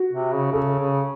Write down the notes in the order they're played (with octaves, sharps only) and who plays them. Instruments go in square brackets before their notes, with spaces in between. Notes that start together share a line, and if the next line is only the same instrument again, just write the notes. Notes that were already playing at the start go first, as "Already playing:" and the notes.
Already playing: [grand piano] F#4
[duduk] C3
C#3
[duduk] C#3 [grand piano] A4
[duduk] C#3